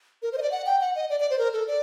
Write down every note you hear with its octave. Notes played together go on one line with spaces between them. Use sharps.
A#4
C5
D#5
D5
F#5
G5
F#5
D#5
D5
D5
C5
A#4
A4
D5